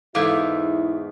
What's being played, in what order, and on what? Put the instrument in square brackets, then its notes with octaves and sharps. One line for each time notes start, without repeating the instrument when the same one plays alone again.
[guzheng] E2 G#2 [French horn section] D#4 E4 [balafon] A4 F5 [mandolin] E5 D6